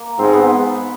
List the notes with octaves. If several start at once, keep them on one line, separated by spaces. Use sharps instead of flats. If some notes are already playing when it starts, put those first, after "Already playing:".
Already playing: A#3
G#2 C4
B3